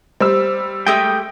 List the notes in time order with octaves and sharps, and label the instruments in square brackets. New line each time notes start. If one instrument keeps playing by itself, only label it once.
[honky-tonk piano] G3 E6 [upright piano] C5
[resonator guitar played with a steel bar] G#3 A3 G4 [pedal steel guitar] G5 D#6